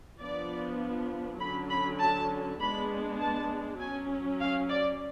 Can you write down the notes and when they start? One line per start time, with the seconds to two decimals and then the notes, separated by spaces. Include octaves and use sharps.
0.20 F3 B3 D4 D5
1.40 D3 F#3 C#4 B5
1.70 B5
1.99 A5
2.59 G#3 B3 D4 B5
3.20 A5
3.80 F#3 C#4 G#5
4.40 F5
4.69 D5